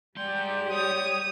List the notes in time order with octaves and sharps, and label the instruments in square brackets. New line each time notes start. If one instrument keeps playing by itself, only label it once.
[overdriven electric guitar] G#2 C6 [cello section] G3 G4 [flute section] D5 G5 G6
[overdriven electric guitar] C#5 [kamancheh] D#6